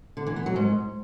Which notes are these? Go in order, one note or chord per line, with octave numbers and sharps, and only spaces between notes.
D3
E3
B3
F#3
G#2